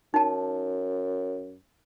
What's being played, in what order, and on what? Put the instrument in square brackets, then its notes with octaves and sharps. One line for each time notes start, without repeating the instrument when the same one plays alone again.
[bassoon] F#2 [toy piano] D#4 A5